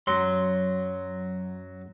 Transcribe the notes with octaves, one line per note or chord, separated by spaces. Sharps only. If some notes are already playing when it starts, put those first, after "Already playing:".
F#2 F#3 C6